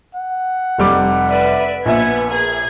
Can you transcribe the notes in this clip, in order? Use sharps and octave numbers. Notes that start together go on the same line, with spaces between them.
F#5
F1 G3 D6
B4 D5 E5
A#1 B3 E5 G#5 G#6
G#4 A#4 G#6